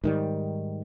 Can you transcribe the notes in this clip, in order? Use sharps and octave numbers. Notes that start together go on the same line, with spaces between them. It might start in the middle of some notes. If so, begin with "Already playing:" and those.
G#2 D#3 G3